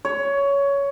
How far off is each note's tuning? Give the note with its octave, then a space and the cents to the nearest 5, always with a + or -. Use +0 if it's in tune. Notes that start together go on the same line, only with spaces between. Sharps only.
C#5 +15